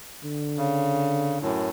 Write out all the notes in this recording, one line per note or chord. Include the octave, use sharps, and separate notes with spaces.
D3
C#3
F#2 A2